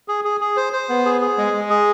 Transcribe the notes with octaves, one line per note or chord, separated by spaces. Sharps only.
G#4
G#4
G#4
C5
C5
B3
G#4
G#4
G#3
G#3
G#4